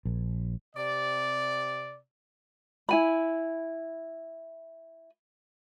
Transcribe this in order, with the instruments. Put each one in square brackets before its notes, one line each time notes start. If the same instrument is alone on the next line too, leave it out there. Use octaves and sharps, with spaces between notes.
[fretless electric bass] A#1
[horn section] C3 D5
[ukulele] E4 G#5 B5